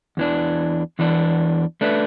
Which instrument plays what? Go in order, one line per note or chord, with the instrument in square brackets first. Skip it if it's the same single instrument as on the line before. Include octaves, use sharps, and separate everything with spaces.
[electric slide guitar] E2 E3 D4
E2 E3 D4
A3 D4 B4 E5